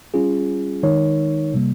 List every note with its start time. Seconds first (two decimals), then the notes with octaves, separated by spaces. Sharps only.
0.14 G3 C#4 F4 G#4
0.83 D#3 G#3 D#4 A#4 C#5
1.54 C3 G3 A#3